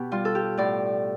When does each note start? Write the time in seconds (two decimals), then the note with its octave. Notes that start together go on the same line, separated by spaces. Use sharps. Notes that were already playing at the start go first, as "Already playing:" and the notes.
Already playing: B2 G4
0.12 G3 F4
0.25 A4
0.35 G4
0.57 A2 D5